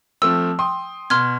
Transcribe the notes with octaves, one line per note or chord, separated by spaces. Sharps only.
F3 A3 C4 E6
G5 C6 D#6
B2 C6 F6 G#6